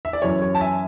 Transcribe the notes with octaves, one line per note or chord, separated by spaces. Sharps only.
E5
D5
F#2 E3 C#5
C#5
A5
E5 G#5